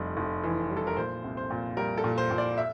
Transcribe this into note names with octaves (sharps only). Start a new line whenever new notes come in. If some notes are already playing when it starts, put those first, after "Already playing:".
Already playing: F1 F2 G3
F1
E3
G3
A4
A#4
A#2 C5
C2
C5
A#2
G3 A#4
A4
A#2
C5
A#2
D5
E5